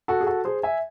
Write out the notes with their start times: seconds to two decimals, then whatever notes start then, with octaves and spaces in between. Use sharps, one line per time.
0.08 F#4 A4
0.21 G#4
0.27 F#4 A4
0.45 G#4 C5
0.63 E5 G#5